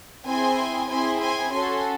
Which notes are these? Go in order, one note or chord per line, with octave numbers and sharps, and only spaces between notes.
C4 E4 G#4 G#5 C6
C4 E4 G#4 G#5 C6
G#5 C6
C#4 F#4 A4 G#5 C6